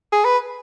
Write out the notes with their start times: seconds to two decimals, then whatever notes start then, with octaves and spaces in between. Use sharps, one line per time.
0.12 G#4
0.25 B4